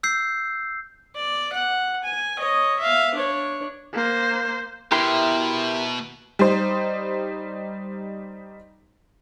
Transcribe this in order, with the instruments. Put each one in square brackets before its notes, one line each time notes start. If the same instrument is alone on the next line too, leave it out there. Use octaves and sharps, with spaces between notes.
[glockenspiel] E6 G6 C7
[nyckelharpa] D5
F#5
G#5
C#5 D#5
E5 F5
D4 C#5
[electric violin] A#3 C5
[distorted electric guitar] B2 [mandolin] E4 [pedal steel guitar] G4 A#4 C6
[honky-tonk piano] G3 D#4 C5